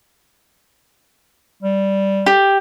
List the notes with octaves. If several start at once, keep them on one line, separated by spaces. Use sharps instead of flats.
G3
G4